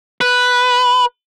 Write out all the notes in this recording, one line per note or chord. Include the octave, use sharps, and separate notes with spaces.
B4